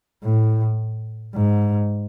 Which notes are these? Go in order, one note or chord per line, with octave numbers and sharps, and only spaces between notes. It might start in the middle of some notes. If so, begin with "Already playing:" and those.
A2
G#2